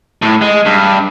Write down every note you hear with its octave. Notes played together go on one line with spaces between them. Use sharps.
A2
G#3
G2